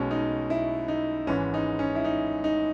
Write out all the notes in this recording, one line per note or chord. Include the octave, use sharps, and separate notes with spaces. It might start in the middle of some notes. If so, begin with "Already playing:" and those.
Already playing: B1 B2 G#3 C#4
D#4
E4
D#4
G#1 G#2 E3 C#4
D#4
C#4
E4
D#4
D#4